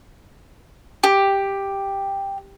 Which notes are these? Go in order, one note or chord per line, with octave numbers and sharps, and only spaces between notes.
G4